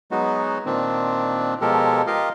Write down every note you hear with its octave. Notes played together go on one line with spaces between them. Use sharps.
F#3 G#3 B3 D#4 F#4
A#2 D#3 C4 D4
B2 F3 G#3 G4 A4 A#4
F4 G4 A#4 D#5 F5